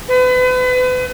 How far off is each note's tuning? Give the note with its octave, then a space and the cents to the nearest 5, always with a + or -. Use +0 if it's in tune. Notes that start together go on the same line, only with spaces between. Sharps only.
B4 +35